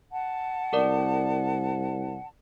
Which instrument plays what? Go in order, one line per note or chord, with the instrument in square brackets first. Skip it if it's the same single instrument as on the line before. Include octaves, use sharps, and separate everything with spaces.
[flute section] F#5 A5
[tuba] C2 [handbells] A4 A#4 D5